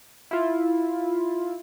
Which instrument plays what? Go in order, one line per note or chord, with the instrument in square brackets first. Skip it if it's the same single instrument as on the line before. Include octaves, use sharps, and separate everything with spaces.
[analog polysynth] E4 F4